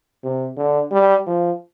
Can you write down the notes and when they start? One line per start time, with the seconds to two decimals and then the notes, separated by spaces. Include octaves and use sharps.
0.24 C3
0.57 D3
0.91 G3
1.27 F3